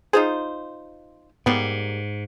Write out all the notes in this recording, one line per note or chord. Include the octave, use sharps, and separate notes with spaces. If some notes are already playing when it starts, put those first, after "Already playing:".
D#4 F4 G#4 C5
G#2 G3 A#3 B3